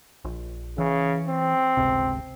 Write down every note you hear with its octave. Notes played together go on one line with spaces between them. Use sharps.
A#1
C#3 E3
C4
G1 C#2 C3